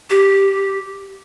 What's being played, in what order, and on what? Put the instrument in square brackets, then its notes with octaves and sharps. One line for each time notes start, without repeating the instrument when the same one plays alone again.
[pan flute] G4